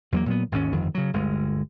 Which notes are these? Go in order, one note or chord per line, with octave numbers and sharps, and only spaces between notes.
E2 F#3 G#3 A#3
A#2 F#3 B3
G#1 D#2 G#2 C#4
G1 F2 D#3
C#3 F#3
G1 D2 G#3